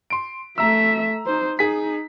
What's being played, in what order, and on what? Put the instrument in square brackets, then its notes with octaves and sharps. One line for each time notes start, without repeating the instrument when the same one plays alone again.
[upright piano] C6 D7
[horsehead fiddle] A3 E5 [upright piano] A#5 E6
[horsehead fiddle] D#4 C5
[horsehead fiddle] D#4 [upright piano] G#4 B6